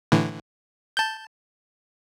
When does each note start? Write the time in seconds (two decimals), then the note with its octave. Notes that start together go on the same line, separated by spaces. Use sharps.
0.12 A2 D3 E3
0.97 A5 G6